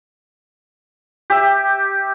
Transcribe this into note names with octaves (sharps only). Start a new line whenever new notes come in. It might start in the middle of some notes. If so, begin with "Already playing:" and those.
G4 E5